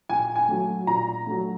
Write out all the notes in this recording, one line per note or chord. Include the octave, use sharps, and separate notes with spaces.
A#2 G#5
G#5
F#3 A3
A#2 A#5
F#3 A3